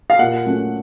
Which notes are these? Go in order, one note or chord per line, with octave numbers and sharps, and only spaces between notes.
F5
A#2 F#5
F#3 A3 C#4